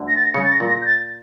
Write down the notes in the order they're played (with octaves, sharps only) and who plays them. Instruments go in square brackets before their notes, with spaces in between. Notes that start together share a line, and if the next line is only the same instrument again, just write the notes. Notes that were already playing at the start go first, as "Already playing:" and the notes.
Already playing: [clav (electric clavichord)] D2 D3
[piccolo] A#6
A6
A#6
[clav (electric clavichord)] C#3 [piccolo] C#7
[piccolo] A6
A#6
[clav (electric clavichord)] A#2
[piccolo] A#6
G6
A6